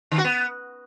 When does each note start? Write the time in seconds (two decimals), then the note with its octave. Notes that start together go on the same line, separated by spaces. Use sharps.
0.12 D#3
0.18 F#4
0.24 B3